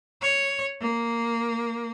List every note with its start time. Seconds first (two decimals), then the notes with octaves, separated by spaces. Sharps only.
0.21 C#5
0.80 A#3